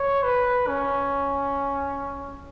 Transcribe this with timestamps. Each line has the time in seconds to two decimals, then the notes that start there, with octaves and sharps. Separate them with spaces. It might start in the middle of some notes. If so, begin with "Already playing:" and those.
Already playing: C#5
0.23 B4
0.67 C#4